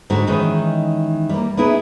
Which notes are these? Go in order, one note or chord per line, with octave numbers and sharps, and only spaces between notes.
G#2 D3 G3 F#4
D#3 E3 G#3 C#4 D#4
G3 A#3
B3 D#4 E4 G#4